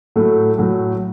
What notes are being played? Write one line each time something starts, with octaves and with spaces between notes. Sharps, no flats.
A2 F#3 A3
A2 F#3 A3